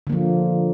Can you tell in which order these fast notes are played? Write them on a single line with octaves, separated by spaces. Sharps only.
D3 A#3 F3